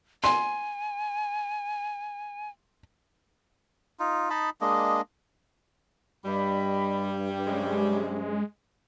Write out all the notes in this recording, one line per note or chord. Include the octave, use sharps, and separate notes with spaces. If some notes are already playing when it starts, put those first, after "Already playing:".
G#5 C6
D#4 F4
D#4 D#5 A5 B5
G#3 A#3 D4 D#5
G2 G3 D4 D#5 B5
C3 F#3 G#3 C#4